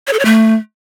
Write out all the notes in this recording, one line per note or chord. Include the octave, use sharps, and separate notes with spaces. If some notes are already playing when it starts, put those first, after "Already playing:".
C#5
A4
C#5
A3